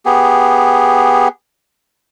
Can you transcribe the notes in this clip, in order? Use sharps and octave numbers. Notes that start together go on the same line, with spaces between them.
B3 G4 G#4